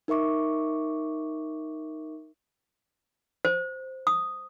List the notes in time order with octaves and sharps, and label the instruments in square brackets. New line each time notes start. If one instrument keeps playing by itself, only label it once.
[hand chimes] D#4 A#4 E5 C#6 D6
[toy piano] C5
D#6